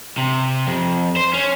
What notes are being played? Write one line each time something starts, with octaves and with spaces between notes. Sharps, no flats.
C3
F2
C5
C#4